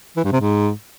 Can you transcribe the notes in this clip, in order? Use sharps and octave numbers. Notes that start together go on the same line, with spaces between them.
E3
G2
C3
G#2